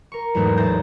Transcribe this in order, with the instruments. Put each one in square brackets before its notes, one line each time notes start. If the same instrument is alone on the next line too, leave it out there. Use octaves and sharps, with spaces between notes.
[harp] A#4 C#6
E2 G#2 F#3 A3 D#4
A1 C5 A5 G6 A#6